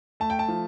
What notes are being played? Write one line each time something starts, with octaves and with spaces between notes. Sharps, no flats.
A3 A5
G5
A5
F3